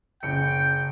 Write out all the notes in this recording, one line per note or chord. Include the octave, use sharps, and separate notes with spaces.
F#1 G5 C#7